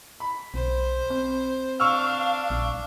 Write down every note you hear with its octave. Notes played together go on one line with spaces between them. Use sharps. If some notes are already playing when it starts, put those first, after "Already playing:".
B5
B1 C5
C4
D4 F5 C#6 E6 F6
A#1